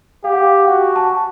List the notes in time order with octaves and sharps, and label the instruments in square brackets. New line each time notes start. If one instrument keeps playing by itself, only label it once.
[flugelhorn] G4 [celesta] F5
[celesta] F#5
F5
[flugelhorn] F#4 [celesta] F#5
[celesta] G#5
A5
A5